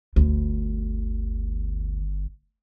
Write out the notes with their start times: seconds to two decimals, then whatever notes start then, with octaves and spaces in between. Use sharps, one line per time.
0.16 G1 D2